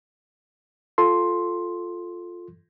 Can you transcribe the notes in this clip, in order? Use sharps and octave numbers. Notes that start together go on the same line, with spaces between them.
F4 A4 C6